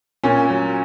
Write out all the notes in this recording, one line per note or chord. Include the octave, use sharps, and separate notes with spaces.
A#2 C#4
F#3